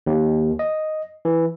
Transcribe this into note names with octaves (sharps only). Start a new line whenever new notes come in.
D#2
D#5
E3